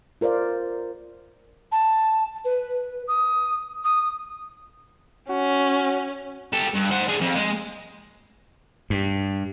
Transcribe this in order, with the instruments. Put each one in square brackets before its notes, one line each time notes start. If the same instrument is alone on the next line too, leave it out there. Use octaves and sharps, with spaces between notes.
[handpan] F4 A#4 C5 D5 F5
[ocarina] A5
B4
D#6
D#6
[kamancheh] C#4 [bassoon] F#4
[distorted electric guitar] G4 A4
G2
C5 F#5
D4 G#4
F2
G#3
[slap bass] G2